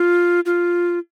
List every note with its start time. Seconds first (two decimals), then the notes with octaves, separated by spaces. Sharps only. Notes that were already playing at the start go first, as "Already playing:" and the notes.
Already playing: F4
0.46 F4